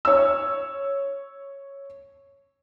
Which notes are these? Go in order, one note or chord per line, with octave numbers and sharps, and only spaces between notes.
C#5 E6